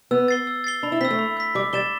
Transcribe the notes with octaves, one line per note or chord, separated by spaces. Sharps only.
B3 E6
A6 C7 G7
E6
A6 C7 G7
D4 B5
E4
C4 E6 B6
A3
B5
E6 B6
G3 D6
G3 A6 E7 G7